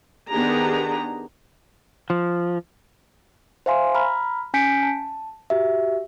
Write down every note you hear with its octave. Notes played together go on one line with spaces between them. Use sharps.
D#3 B3 D4 G4 G#4 A#5
F3
C5 E5 F5 G#5 C6
A#5 B5 F6
C#4 G#5 G6 B6 C#7 D7
A5
F#4 G4 E5